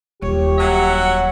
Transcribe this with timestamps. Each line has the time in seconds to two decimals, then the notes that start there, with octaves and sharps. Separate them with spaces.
0.22 D#1 G4 C#5
0.59 F#3 E5 F#5